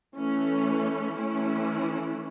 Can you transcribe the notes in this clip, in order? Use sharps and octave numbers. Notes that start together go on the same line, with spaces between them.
E3 A3 C#4
E3 A3 C#4 E4